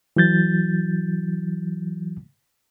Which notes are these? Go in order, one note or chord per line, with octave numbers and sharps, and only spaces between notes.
E3 F#3 G6 A6